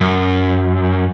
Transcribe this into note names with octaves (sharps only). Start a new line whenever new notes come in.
F#2